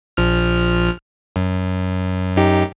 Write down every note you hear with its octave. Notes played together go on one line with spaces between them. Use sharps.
A#1 F3 F6
F#2
F#2 D#4 G4